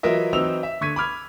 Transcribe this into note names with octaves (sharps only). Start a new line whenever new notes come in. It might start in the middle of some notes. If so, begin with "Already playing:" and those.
E3 F#3 F4 A#4 D#5 E5
E3 F#3 C4 D#4 E6 F7
E5
D3 C#6 G#6 B6 D#7
B5 D6 F6 G#6